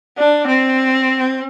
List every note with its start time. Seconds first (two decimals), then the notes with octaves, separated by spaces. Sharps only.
0.18 D4
0.47 C4